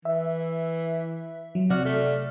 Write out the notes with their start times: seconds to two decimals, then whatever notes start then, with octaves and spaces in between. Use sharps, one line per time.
0.05 E3 E5
1.55 F#3
1.70 C3 F#4 D5 F6
1.85 A3